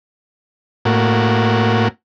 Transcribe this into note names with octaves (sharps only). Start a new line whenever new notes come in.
A2 A#3 F#4